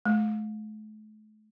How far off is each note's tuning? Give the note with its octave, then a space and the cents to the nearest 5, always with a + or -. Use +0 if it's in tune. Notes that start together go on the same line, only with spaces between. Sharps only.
A3 -40